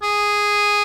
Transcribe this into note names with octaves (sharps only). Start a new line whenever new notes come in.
G#4